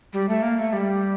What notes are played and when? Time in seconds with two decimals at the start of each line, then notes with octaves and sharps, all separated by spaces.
0.13 G3
0.29 A3
0.42 A#3
0.59 A3
0.73 G3